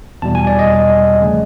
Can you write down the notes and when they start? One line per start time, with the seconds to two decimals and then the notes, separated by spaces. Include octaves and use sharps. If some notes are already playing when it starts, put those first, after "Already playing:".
0.22 E2 B2 G3 A5
0.35 G#5
0.47 D5
0.59 D#5
1.21 C#3 F3 A3